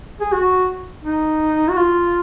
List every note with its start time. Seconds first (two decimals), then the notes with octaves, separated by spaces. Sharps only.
0.20 G#4
0.32 F#4
1.04 D#4
1.69 F#4
1.77 F4